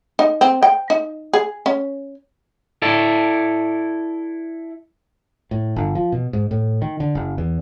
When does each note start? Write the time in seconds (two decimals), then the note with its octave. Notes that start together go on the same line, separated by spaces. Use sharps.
0.19 D#4
0.41 C4
0.63 G5
0.90 D#4
1.33 G#4
1.66 C#4
2.82 E4 A4 D5
5.51 A2
5.76 G1
5.95 F3
6.12 B2
6.33 G#2
6.51 A2
6.82 D#3
7.00 D3
7.15 F#1
7.38 E2